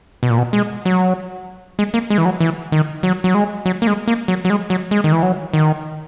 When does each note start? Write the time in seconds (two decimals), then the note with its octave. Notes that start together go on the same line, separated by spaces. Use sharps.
0.23 B2
0.30 A#2
0.38 B2
0.53 G#3
0.85 F#3
1.79 G#3
1.94 A#3
2.10 G#3
2.18 E3
2.25 F#3
2.40 E3
2.72 D#3
3.03 F#3
3.24 F#3
3.35 G#3
3.66 F#3
3.82 A#3
3.87 G#3
4.07 A#3
4.28 F#3
4.45 F#3
4.50 G#3
4.70 F#3
4.91 G#3
5.04 D#3
5.12 E3
5.23 F#3
5.53 D#3